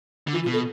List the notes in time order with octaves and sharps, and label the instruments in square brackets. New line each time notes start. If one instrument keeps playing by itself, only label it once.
[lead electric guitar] D3
[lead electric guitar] E3 [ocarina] F4
[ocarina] F4
[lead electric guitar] B2
[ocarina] A4